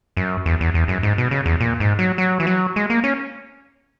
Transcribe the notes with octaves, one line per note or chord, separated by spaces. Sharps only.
F#2
E2
E2
E2
F#2
G#2
B2
C#3
E2
A#2
G#2
F#3
F#3
E3
F#3
G#3
A#3
C#4